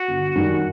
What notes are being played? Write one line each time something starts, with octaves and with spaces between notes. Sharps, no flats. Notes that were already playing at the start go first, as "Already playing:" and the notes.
Already playing: F#4
G1
F#2 D#3 G3